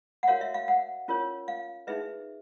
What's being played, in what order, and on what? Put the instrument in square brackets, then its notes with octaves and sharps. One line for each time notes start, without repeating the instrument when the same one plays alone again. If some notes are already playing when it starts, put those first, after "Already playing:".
[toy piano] F#5
F#4 A#4 C#5 F5
E5
F5
F#5
C#4 F4 A#4 C#5
F5
D#4 G#4 B4 E5